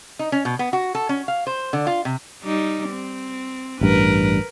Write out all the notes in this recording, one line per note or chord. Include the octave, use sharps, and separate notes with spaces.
D#4
C#4
B2
B3
F#4
A4
C#4
F5
C5
D3
F4
C3
G3 D#4
C4
A1 G2 A#4 B4